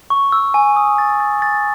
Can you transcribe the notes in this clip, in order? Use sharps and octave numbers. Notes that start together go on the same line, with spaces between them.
C#6
E6
G#5
D#6
A6
A6
A6